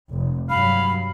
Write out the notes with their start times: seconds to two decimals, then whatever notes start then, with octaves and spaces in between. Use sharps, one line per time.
0.11 F1
0.50 G2 F#3 F5 B5